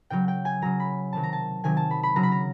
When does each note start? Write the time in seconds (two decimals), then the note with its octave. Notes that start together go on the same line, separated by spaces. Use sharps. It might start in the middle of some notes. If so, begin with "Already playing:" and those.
0.10 C#3 F#3 G5
0.28 G5
0.45 G#5
0.62 C#3 F#3 A#5
0.80 B5
1.13 C3 D#3 F#3 A5
1.23 A#5
1.33 A5
1.64 C3 D#3 F#3 G#5
1.77 A5
1.91 B5
2.03 B5
2.16 C#3 F#3 A#5
2.23 B5
2.32 A#5